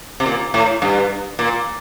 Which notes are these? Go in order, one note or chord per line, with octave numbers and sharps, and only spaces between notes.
C3
A#2
A2
G2
A#2